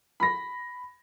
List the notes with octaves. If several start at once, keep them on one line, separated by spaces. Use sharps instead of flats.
B5 A#6